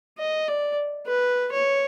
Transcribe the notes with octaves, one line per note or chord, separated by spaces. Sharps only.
D#5
D5
B4
C#5